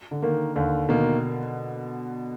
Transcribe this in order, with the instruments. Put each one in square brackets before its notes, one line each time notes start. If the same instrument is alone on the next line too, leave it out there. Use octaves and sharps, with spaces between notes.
[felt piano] D3
[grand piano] D#3 A#3
[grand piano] D#2 [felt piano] D3
[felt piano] B2 [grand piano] D#3 A#3